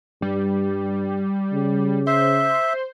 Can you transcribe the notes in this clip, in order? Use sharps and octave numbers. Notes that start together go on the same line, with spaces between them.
G2 G3
C#3
C5 E5